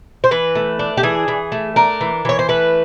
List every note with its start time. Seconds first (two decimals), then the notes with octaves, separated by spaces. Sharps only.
0.24 C5
0.31 E3 B4
0.55 A3
0.79 D4
0.97 G4
1.03 E3 G#4
1.28 E3
1.52 A3
1.76 D4 A#4
2.01 E3
2.25 E3 C#5
2.39 C5
2.48 A3 B4